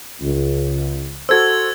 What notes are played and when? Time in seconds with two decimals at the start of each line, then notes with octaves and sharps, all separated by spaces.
0.21 C#2
1.29 F#4 A4 C5 E6 G#6